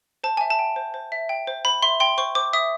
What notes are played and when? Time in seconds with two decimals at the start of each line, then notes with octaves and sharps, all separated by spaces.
0.24 C5 A5
0.37 E5 G#5
0.50 A5
0.59 G5
0.76 C5
0.94 C5
1.12 E5
1.29 G5
1.47 C5
1.65 C5 B5
1.83 E5 C6
2.00 G5 C6
2.18 C5 C#6
2.35 C5 D6
2.53 E5 D#6